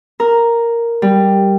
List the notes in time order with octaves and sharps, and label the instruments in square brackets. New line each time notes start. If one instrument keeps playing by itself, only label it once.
[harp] A#4
G3